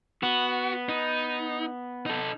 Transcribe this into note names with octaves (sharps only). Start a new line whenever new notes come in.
B3 F#4
D#4
D#4 A4